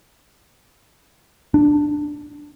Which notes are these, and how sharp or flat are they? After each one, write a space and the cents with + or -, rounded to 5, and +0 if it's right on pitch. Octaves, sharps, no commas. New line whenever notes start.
D4 +5